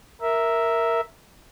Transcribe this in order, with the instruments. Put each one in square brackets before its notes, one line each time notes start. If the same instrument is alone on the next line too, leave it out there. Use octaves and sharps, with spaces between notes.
[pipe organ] A#4 E5